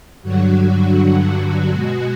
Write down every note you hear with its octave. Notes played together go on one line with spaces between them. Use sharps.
G2 D3 F#3 F#4
B2 G#3 F#4